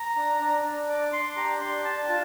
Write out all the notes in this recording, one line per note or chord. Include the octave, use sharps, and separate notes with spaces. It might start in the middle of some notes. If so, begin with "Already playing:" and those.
Already playing: A#5
D4
D4
D4
D5
D4 C6
G4 A#5
D4 C6
D4 A5
F4 A5